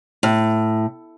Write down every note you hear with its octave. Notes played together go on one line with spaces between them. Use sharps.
A2